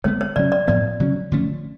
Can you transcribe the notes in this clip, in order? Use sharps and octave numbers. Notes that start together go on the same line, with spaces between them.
D3 G#3 B3 C#5
C#5
C#3 F#3 C#4 D5
D5
A2 F3 B3 D5
C#3 F#3 C#4
D3 F3 A3 C#4